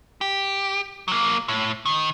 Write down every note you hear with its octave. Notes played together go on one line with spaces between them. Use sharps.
G4
F#3 A#3
A2
D#3